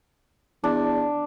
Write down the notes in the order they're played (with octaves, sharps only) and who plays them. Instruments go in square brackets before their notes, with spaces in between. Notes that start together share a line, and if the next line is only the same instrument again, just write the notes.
[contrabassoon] E2 [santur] D4